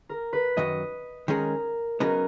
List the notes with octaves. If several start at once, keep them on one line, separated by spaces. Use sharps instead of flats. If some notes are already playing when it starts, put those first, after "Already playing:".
A#4
B4
F#2 D#3 F#3 D#5
D#3 G#3 C#4 G#4 A#4
C#3 F#3 B3 D#4 A#4